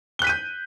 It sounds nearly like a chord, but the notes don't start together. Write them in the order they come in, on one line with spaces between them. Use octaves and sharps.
G7 F#6 B6 D#7 G6